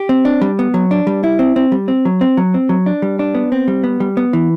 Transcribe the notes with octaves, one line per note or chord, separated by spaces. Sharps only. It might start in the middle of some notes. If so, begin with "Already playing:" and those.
Already playing: G4
C4
D4
G3
B3
F#3
D4
G3
E4
C4
C4
G3
C4
F#3
C4
F#3
C4
F#3
D4
G3
D4
B3
C4
G3
B3
G3
B3
E3